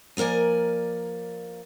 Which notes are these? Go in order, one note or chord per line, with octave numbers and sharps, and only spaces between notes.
F3 A#3 A#4 D5 G#5